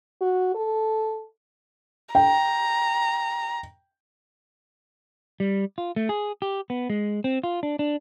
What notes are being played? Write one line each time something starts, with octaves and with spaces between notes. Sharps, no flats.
F#4
A4
G5 A#5
G3
F4
A3
G#4
G4
B3
G#3
C4
F4
D4
D4